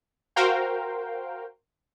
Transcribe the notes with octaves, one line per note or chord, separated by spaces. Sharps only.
F#4 A#4 C5 F5 G5